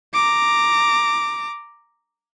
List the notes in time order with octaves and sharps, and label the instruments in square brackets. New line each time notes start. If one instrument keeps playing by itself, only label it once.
[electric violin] A#5 D6